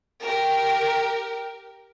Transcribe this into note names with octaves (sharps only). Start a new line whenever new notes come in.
G4 A#4